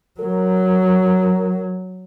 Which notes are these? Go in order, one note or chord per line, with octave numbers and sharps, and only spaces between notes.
F#3 A#4